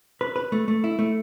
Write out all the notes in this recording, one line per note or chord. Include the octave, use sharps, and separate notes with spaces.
B4
B4
A3
A3
E4
A3